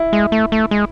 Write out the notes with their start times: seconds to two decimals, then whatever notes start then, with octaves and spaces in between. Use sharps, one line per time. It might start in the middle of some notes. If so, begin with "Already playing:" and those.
Already playing: E4
0.13 G#3
0.32 A3
0.52 A3
0.71 G#3